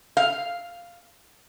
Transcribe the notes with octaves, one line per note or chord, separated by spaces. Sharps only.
F5